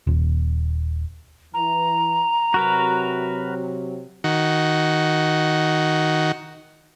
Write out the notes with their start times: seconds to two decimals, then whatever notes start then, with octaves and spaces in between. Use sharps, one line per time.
0.07 D#1
1.54 E3 A#5
2.54 C3 F#3 F#4 A#4 B4
4.24 D#3 F#4